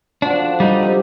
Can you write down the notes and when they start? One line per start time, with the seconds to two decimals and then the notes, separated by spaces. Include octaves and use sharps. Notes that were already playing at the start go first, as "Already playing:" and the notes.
0.22 D3 F3 D4 F#4
0.60 G3 D#4
0.83 C3